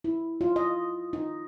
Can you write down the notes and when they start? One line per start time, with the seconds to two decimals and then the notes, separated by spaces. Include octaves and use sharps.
0.04 E4
0.41 F4
0.56 D#5
1.13 D#4